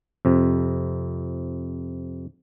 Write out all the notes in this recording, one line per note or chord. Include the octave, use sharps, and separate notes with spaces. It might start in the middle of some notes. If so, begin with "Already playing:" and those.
F2 C3